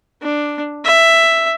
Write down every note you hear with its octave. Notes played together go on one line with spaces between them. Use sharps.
D4
E5